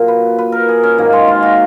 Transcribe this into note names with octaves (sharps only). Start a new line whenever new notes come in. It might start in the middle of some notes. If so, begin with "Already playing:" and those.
Already playing: A#2 F#3
B4
B4
A#4
G#4
C#4
G#2 D#3 F#3 A#3
G#3
F4
F#4